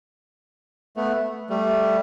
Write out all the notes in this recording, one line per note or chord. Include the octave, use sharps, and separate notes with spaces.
A3 B3
G3 A3